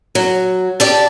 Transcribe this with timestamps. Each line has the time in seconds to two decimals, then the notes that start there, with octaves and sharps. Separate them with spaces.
0.15 F#3
0.80 G4 D5 A5